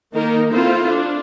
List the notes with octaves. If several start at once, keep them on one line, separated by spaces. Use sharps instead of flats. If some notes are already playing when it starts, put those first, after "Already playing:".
D#3 A#3 D#4 A#4
C4 E4 F4 A4 C5
D4